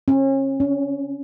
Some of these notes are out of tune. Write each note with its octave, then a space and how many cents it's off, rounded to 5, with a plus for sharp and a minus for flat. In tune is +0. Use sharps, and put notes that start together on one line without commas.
C#4 -35
C#4 +25